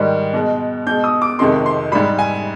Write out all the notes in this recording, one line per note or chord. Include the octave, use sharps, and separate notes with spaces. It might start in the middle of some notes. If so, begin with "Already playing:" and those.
Already playing: G#2 D#3 G3
B2 G#3
B2 G#3 G6
D#6
D6
F2 C3 D#3 G#3 C6
C6
G#2 G3 B5
G#5